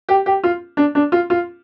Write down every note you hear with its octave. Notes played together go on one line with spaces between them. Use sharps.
G4
G4
F4
D4
D4
F4
F4